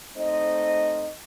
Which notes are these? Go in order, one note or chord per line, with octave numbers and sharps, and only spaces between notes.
A3 C4 D#4 C5 D#5